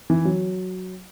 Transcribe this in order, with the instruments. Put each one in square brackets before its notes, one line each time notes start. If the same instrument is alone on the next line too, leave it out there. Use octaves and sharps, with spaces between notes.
[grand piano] E3
F#3